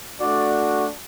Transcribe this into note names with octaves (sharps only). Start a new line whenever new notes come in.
A3 D4 F#4 D5